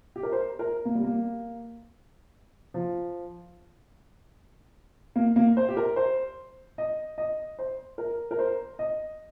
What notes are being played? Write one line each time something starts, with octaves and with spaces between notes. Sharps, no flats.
G4
A#4
C5
A#4
A#3
G3
A#3
F3
A#3
A#3
C5
G4
A#4
C5
D#5
D#5
C5
A#4
A#4
C5
D#5